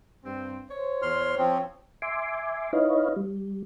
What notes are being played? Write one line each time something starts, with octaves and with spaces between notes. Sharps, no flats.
G2 C4
C5 C#5
E2 C6 F6
F3 C4
E5 G#5 C6 D6
D#4 E4 B4 C#5 D#5 F5
G3